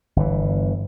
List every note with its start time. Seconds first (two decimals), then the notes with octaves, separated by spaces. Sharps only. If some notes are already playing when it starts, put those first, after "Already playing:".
0.16 G1 E3